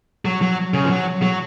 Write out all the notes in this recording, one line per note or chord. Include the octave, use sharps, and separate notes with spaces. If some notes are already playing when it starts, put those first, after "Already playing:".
F#3
F#3
C#3
F3
F#3
F#3